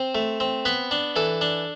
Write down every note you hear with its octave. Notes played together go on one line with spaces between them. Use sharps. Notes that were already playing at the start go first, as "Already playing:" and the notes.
Already playing: C4 C5
A3
C4
B3 B4
D4
E3 A4
D4